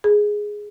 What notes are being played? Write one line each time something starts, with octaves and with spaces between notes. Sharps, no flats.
G#4